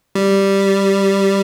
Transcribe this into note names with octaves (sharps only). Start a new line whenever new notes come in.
G3